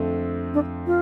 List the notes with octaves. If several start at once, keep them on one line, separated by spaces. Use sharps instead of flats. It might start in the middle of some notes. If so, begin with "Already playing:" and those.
Already playing: F2 D3 A3 C4
D4
F4